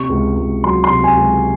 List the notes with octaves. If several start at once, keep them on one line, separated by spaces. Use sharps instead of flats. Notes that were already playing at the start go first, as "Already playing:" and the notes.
Already playing: C3 C#6
C#2
C#2
F#3 C6
C6
C3
G#5
C#2